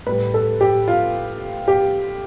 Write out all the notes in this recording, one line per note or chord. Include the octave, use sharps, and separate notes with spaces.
A2 G3 B4
A4
G4
F4
G4